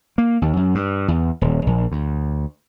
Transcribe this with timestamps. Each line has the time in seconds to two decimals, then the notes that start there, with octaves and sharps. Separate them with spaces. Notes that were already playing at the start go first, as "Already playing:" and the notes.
0.18 A#3
0.42 D#2
0.57 F#2
0.75 G2
1.08 E2
1.41 D#1
1.67 A#1
1.92 D2